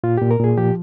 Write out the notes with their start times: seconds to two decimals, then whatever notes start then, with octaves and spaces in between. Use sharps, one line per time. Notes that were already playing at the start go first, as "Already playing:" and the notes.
0.04 A#2 F4
0.17 A#2 G4
0.31 A#4
0.39 A#2 G#4
0.57 F3 G4